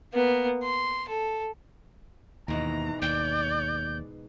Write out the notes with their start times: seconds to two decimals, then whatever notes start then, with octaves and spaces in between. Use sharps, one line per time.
0.13 A#3 B3
0.63 C6
1.08 A4
2.48 D#2 G#2 B2 E3 A#5
3.02 D#2 D5 G6